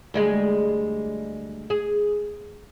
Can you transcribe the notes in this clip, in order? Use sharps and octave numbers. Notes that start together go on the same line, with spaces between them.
D2 G3 G#3
G#4